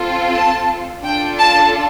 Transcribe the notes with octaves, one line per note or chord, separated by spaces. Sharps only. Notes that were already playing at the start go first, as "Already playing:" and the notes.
Already playing: C4 F4 A4
A5
D4 F4 A4 G5
A5